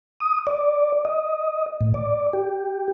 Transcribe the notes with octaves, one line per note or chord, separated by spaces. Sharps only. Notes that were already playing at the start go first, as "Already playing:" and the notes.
D#6
D5
D#5
A2
D5
G4